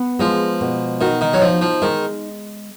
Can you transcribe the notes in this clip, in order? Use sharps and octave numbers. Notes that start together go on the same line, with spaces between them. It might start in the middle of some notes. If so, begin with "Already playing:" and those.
Already playing: B3
F3 G#3
B2
D#3 F#4
D#3
F#3
F3 D#4
F3
D#3 G#3